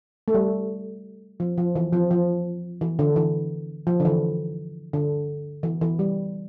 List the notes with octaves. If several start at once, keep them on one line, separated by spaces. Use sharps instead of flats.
A3
G3
F3
F3
E3
F3
F3
E3
D3
E3
F3
D3
E3
D3
E3
E3
G3